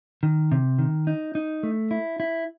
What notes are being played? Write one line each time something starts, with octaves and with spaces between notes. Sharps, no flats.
D#3
C3
D#3
D#4
D#4
A3
E4
E4